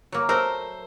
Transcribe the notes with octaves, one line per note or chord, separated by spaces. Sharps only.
F#3 A#3
A3 A#4 C5 E6